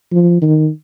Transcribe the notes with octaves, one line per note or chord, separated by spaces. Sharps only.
F3
D#3